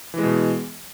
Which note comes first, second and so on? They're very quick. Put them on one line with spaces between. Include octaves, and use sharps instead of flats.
E3 G#3 B2